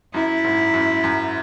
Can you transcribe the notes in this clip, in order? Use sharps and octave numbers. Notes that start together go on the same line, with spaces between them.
F#2 E4
G#2
F#2
F#2